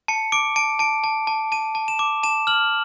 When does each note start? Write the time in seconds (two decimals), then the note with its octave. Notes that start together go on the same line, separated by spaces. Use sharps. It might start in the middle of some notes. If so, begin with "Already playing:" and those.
0.08 A5 C#7
0.32 D6 D7
0.56 A5 D7
0.79 A5 D7
1.04 A5
1.27 A5
1.52 A5 D#7
1.75 A5
1.88 E7
1.99 D6
2.23 A5 E7
2.47 F6 F#7